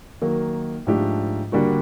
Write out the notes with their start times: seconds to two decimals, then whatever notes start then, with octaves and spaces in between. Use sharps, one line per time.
0.22 D#3 F#3 A#3
0.87 G#2 F3 A3 D4 G4
1.52 D3 G3 A#3 D4 F#4